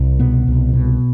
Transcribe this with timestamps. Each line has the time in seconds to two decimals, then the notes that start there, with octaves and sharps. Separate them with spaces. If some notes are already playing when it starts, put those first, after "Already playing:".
Already playing: C2
0.20 B2 B3
0.47 C2
0.73 B2